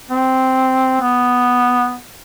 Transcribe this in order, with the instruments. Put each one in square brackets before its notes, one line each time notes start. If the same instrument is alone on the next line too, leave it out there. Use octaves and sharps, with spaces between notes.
[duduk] C4
B3